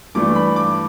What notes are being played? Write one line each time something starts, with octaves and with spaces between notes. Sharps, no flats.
G2 E3 A3 D4 D6
B5
D6